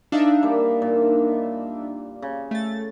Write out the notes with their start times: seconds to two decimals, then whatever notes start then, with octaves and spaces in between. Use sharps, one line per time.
0.12 D4 D#4 E5 F5
0.43 G3 A#3
0.82 A#2
2.22 C#3
2.51 A3 A6